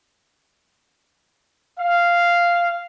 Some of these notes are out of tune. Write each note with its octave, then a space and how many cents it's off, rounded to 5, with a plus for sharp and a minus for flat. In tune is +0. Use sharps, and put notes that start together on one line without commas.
F5 -5